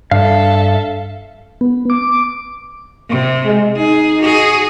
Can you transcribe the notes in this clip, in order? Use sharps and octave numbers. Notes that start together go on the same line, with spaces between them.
G2 D4 A4 E5 F5
B3
D6
C3
G#3
D#4 G#4
F#4 G#4